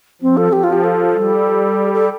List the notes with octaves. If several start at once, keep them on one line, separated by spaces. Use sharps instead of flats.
F3 C4
A4
F3 G4
F4
G4
A4
G3
A4